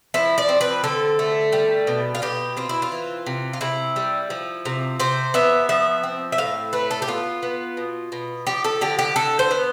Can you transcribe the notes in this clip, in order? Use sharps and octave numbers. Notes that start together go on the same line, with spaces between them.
F3 E4
D5
C4
B4
D3 A4
A3
G3
B2
F4
B2 G4
C4 F4
E4
F4
E3
C3
F4
C3 E4
G3
F3
C3
C3 C5
B3 E5
F3 E5
C4
E5
A2 F5
A3 B4
A4
G4
B3 F4
B3
B2
B2
F3 G4
A4
D3 G4
G4
D3 A4
C5
B3